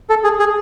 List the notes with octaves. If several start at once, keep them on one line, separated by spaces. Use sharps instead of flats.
A4
G#4
G#4